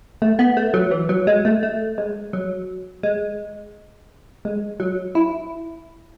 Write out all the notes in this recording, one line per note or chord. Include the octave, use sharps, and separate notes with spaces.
A3
B3
A3
F#3
E3
F#3
G#3
A3
A3
G#3
F#3
G#3
G#3
F#3
E4